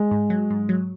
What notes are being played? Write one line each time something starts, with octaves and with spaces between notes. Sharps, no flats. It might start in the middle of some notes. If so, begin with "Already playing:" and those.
Already playing: G#3
G#2
F#3
G#2
F#3